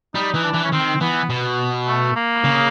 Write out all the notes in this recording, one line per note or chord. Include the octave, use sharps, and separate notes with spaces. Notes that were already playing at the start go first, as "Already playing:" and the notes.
G3 D#4
E3
D4
E3
C#4
D#3 C4
E3 B3
B2
A3
A#3
C#3